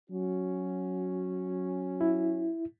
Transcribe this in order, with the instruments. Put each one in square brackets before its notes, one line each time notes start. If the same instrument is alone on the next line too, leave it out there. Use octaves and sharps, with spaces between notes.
[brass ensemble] F#3 C#4 F#4
[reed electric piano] E4